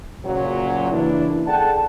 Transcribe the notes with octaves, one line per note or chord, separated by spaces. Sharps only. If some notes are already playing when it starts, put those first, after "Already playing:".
F#1 A#2 F#3
C#3 E3 A#3 D4 E4
G#4 A4 D5 F#5 G5 A5